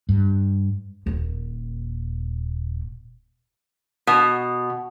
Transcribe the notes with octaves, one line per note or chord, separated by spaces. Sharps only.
G2
D#1 A#2
B2